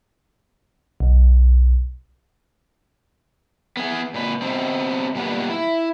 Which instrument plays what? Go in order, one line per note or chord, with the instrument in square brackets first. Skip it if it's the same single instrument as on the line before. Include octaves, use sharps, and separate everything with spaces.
[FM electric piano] B1
[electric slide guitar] B3 G#4
A#2 B4
B2 B3 C4
A#2 G3 B3 B4
E4